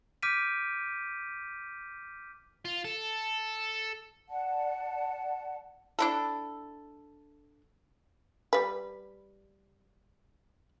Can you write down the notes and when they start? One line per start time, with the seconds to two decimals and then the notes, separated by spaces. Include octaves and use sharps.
0.23 D6 F6 G6 B6 D7 D#7
2.65 F4
2.85 A4
4.29 D5 F#5 A5
5.99 D4 E4 A4
8.53 G3 B4